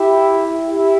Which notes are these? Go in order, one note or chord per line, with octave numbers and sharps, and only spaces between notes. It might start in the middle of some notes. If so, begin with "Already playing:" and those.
Already playing: E4 G4
E4 G4